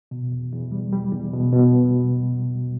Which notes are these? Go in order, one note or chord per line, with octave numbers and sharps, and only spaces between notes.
B2
E2
E2
G3
G3
E2
B2
B2